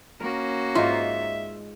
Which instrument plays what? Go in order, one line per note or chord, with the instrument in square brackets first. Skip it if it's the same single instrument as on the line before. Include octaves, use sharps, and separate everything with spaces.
[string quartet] A#3 C#4 F#4 [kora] A#4
[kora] G#2 D#4 [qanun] F4 [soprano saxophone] E5